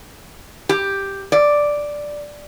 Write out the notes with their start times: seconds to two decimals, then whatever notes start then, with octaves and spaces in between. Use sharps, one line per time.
0.69 G4
1.32 D5